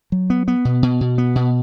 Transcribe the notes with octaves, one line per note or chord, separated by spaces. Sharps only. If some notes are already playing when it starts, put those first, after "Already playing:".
F#3
B3
B3
B2
B2
B2
B3
B2